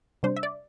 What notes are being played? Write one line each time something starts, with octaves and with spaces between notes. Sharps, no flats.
C3 G3 D4 C5
E5
D5